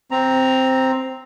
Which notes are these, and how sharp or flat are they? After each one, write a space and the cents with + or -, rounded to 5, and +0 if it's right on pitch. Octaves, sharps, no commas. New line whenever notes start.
C4 +0 A#5 +0